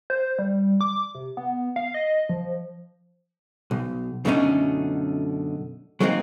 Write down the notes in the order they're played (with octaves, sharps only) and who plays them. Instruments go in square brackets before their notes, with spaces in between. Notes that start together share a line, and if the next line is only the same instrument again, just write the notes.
[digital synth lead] C5
G3
D6
C3
B3
F5
D#5
F3
[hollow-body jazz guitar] B1
F#2 B2 D3 A3 C#4 D#4
F#3 G#3 A#3 C4 D#4